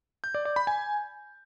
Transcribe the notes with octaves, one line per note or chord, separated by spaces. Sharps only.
G6
D5
D5
B5
G#5